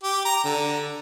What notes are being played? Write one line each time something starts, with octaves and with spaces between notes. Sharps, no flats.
G4
A#5
D3